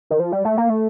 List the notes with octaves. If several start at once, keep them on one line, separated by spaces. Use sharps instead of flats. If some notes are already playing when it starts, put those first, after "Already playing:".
D#3
F3
G3
A3
A#3
A3